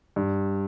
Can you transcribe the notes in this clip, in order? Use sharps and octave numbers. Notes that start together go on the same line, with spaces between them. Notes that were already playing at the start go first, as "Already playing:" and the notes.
G2